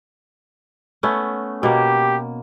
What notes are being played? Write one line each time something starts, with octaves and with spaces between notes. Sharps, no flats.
A3 B3 C#4
B2 A#3 G4